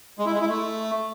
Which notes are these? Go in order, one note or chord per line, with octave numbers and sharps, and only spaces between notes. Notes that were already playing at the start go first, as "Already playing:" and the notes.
G#3
E4
G#3
E4
A3